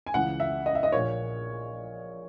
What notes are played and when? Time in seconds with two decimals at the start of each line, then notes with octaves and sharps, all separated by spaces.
0.06 G#5
0.14 C#2 C#3 E3 F#5
0.40 E5
0.66 D#5
0.75 E5
0.83 D#5
0.92 A#1 A#2 C#5